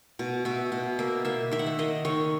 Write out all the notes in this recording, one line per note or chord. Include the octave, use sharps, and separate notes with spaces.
B2
B2 E5
B2
A#3 E5
A#3 E5
D#3 E5
F#5
E5
D#3 D#5
D#3 C#5